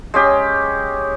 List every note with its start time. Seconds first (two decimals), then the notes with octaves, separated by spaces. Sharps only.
0.14 G#3 C#4 G4 G#4